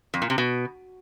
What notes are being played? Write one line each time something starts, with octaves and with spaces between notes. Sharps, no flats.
F2
A#2
C3
B2